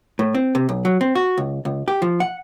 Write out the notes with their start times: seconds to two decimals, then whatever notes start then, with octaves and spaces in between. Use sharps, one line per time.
0.19 A2
0.34 C4
0.55 C3
0.69 B1
0.85 F#3
1.01 C4
1.15 F#4
1.38 C#2
1.65 C#2
1.88 G4
2.02 F3
2.20 F#5